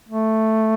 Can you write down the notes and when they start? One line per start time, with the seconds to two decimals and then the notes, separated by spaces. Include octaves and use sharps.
0.09 A3